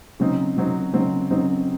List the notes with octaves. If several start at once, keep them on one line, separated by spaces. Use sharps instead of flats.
C#3 F#3 C4 D#4
C#3 F#3 C4 D#4
C#3 F#3 C4 D#4
C#3 F#3 C4 D#4